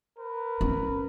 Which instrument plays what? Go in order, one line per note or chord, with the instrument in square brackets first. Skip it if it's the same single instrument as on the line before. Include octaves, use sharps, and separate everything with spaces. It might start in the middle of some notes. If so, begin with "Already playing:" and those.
[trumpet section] A#4 B4
[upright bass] C#4